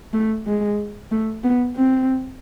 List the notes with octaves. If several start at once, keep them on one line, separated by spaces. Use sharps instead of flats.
A3
G#3
A3
B3
C4